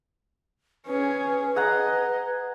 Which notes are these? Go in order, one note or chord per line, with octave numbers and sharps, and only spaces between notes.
C#4 G#4 B4
G#4 D#5 F#5 A#5